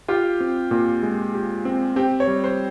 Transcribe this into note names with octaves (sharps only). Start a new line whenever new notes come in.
F4 G4
C4
A#2
G#3
G4
C4
C4 G4
C#5
G3
C5